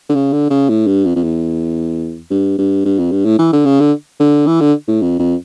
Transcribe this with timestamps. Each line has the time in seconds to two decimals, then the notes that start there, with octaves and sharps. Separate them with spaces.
0.09 D3
0.15 C#3
0.32 D3
0.50 C#3
0.69 A2
0.87 G2
1.05 F2
1.15 F2
1.23 E2
2.31 G2
2.58 G2
2.85 G2
2.99 F2
3.11 G2
3.25 A2
3.39 E3
3.53 D3
3.66 C#3
3.80 D3
4.20 D3
4.47 E3
4.61 D3
4.88 A2
5.02 F2
5.19 F2